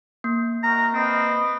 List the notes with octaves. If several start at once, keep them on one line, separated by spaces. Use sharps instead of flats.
A#3
D#4 F#4 A#4 A#5
C4 B4 D#5